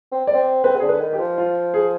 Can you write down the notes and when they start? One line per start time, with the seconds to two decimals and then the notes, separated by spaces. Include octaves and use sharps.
0.12 C4
0.27 D5
0.34 C4
0.64 C4 B4
0.76 C3
0.80 D3 G#4
0.89 B4
1.00 D#3
1.13 G4
1.19 F3
1.38 F4
1.74 G#4